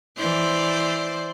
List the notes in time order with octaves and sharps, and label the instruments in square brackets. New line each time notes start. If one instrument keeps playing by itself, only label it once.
[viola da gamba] E3 C5 D5